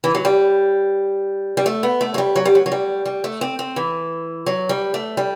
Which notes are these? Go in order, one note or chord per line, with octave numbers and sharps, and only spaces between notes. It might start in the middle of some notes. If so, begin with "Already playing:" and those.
E3
F#3
G3
G3
A3
B3
A3
F#3
G3
F#3
G3
F#3
F#3
G3
G3
A3
C4
C4
E3
F#3
G3
A3
G3